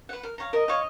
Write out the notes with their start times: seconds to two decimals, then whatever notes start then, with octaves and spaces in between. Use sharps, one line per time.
0.09 B4 F#5
0.23 A#4
0.38 C#5 F5 A#5
0.53 A#4 D#5
0.68 C#5 F5